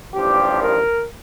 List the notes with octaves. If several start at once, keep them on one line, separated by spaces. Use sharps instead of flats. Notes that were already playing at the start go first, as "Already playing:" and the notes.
A1 G2 F3 G4
A#4